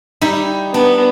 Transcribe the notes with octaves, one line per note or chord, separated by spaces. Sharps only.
G3 D#4 E4 G4
B3 D4